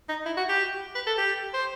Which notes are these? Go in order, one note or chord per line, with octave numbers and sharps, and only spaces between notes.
D#4
E4
F#4
G4
B4
A4
G4
C5